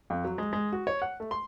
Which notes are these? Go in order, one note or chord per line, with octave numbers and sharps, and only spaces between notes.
F2
F#3
G#3
G#3
F#4
C#5
F#5
A3
C6